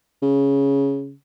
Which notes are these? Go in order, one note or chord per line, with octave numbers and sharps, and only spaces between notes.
C#3